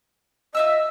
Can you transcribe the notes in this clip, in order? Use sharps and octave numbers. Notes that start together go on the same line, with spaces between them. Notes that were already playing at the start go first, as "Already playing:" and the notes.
F4 D#5 E5 E6